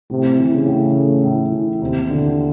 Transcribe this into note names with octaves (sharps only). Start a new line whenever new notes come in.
A2 C3
E3
C#3
A2
A3
A2
E3
D#2 C3
B2 D3